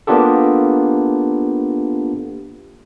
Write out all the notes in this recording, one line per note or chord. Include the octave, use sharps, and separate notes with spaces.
A#3 B3 D4 F4 G4 A4